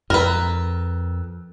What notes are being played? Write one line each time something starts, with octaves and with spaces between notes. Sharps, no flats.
F2 A#4 B4